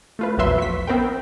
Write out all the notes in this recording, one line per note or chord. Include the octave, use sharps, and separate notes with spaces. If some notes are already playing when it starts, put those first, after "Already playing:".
A3 F4 B4
A#1 E2 F#3 B4 E5 C6
C#6 B6
B3 C4 A#4 G5